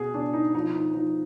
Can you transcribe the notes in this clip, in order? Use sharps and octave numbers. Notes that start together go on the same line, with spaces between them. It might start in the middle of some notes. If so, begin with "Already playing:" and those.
Already playing: B2 G#4
B2 D4
D#4
F3 D#4
D#4
F3 D#4